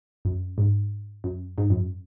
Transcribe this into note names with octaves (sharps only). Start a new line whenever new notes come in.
F#2
G#2
F#2
G#2
F#2